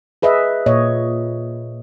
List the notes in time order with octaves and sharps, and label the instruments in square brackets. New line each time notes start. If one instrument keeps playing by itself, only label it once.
[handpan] G#4 B4 D#5 E5
A#2 C#5 D#5